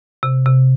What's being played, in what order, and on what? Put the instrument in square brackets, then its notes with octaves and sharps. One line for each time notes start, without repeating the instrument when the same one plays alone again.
[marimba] C3
C3